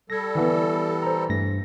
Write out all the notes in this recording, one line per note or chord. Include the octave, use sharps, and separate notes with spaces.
G3 A4 G#6 A#6
E3 B3
C5 A#5
G2 A3 A#6